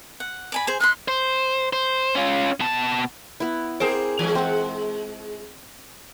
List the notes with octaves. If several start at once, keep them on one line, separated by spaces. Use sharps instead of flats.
F#5
D5 G#5 B5
G#4 C5 G#5
D#4 B5 C6 F#6
C5
C5
C#4 F4
B2 A5
B3 E4
C4 G#4 A#4 C5 D6
E3 G#3 G#5
C4 F#5